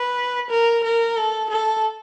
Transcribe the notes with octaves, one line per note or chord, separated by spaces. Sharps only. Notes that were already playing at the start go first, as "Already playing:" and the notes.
Already playing: B4
A#4
A#4
A4
A4